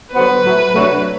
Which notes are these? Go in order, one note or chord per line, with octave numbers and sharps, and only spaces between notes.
D3 F#3 B3 F#4 B4 C5
A2 F#3 A3
C3 F#3 A3 D4 F#4